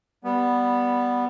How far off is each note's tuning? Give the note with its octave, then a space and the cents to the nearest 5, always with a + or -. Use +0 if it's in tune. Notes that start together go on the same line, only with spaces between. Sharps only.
G3 +0 B3 -5